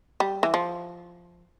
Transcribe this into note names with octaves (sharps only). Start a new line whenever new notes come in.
G3
E3
F3